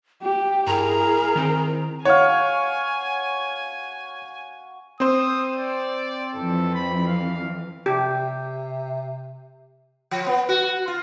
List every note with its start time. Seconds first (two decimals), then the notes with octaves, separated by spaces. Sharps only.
0.22 G4 G5
0.67 G2 E4 G#4 A#4 A#5
1.35 D#3 C4
2.05 F#4 C#5 F5 G#5
5.00 C4 C5 D#6
5.56 D5
6.35 F2 E3 A4
6.75 B5
7.08 F5
7.86 C3 G4
10.11 F3
10.26 B3
10.49 F#4
10.88 F4